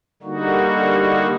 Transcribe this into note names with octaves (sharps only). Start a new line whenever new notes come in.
D3 G3 A#3 D#4 F#4